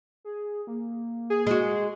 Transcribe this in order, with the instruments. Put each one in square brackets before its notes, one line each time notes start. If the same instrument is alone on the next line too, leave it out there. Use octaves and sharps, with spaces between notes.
[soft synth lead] G#4
A#3
[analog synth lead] G#4
[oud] G#3 F#4